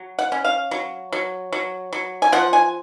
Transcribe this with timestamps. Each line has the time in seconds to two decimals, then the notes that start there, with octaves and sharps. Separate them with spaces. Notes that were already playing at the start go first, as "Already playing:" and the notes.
Already playing: F#3
0.19 F#5
0.32 C#4
0.45 F5
0.71 F#3
1.12 F#3
1.53 F#3
1.93 F#3
2.22 G#5
2.32 F3 F#5
2.53 G#5